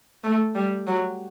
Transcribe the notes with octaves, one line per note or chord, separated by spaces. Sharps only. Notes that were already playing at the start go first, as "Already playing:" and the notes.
A3
G3
F#3